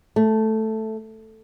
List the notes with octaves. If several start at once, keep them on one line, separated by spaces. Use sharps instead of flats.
A3